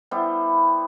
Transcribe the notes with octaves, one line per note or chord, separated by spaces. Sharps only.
G3 B3 E4 C5